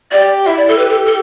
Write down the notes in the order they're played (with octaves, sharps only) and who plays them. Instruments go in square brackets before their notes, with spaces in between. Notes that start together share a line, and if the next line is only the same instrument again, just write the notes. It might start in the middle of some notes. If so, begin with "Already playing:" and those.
[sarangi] G4 [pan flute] D5
[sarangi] E4 [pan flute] E5
[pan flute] D5
A4
[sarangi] G4 [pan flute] B4
[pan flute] A4
A4